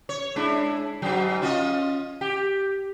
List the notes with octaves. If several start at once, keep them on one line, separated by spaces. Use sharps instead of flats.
C#5
G#3 D4 E4
G#2 F#3
C#4 F4 D#5
G4